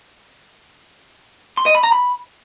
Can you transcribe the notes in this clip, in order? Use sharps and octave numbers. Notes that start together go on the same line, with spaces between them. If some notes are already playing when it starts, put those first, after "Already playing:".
C6
D#5
B5
A#5
B5